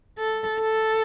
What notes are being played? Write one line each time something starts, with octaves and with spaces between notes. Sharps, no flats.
A4
A4